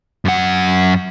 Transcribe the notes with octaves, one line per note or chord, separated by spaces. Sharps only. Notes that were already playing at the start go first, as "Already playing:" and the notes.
F#2 F#5